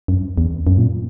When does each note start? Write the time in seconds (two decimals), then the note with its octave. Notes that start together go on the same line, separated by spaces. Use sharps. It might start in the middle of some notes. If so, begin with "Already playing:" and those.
0.08 F#2
0.38 E2
0.67 F#2
0.78 A#2